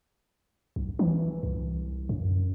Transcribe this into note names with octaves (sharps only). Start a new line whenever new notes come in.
B1
E3
C2
F#2